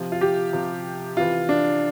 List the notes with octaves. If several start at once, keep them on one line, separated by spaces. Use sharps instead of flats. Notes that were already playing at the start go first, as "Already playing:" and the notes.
Already playing: C3 F3
F4
G4
C3 F3
C3 E3 F4
D4